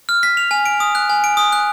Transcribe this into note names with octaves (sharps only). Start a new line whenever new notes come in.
F6
B6
F7
G#5
D7
D#6
F#6
G#5
D7
D#6
F#6